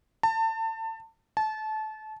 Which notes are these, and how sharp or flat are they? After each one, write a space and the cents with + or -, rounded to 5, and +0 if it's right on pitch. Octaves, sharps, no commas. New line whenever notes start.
A5 +30
A5 -25